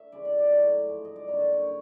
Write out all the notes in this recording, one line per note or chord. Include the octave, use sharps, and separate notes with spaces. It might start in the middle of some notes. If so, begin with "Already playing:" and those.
Already playing: E5
C#3 E3 G#3 D5
D5
D5
A2 F#3 A3
G#2 F3 G#3
D#5
D5
F#2 D3 G3 A#3 C#5
C5
C#5
C#3 C#5